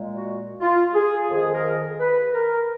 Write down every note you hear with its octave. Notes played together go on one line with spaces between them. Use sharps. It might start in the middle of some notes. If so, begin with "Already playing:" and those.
Already playing: A#2 G#3
F#4
F4
G#4
F2 D#3 G#3 G#4
A#4
B4
A#4